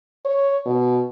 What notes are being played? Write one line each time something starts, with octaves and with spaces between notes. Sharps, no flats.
C#5
B2